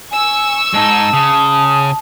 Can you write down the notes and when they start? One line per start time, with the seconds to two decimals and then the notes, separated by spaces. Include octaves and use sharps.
0.11 G#5 C#6 E6
0.74 G#2 D#4 A5
1.13 C#3 D#6